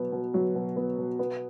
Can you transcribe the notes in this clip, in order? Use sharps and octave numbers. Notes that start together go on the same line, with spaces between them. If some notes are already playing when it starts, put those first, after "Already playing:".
Already playing: B2 F#3 B3
B2
F#3
B2
B3
B2
B3